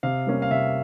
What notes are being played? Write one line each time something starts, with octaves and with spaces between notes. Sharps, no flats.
C3 F5
G3 A#3 C#4
F5
C3 E5